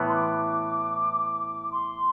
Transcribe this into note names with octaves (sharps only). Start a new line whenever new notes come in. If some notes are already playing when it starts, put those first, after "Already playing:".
Already playing: A2 E3 B3
C6
D6
C6